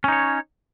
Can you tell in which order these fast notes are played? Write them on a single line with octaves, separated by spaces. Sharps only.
C#4 D#4 C#5